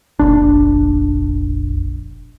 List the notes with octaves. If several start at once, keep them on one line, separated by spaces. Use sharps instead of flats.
F1 A#1 D4